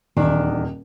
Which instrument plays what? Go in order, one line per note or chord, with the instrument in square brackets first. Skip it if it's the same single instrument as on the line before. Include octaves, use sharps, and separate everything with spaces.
[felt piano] D#1 [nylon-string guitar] E2 D#3 D4